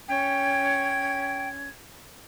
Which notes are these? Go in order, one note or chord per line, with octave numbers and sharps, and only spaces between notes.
C#4 G5 G#6